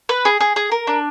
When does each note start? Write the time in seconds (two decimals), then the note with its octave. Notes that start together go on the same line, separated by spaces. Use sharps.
0.09 B4
0.25 G#4
0.40 G#4
0.56 G#4
0.72 A#4
0.87 D4